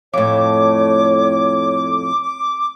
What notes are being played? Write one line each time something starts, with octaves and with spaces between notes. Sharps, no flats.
F2 A2 C#5 D6